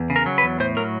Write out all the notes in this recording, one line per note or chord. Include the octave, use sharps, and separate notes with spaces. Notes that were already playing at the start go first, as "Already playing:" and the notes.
Already playing: E2
C#3
A#4
F#3
B4
E2
A2 C5
F#3 A#4